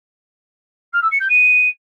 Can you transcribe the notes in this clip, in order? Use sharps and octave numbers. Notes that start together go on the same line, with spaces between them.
F6
E6
C#7
G6
D#7